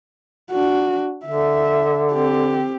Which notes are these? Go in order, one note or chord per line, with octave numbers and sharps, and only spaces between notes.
D4 F#4
D3 E5
C4 G4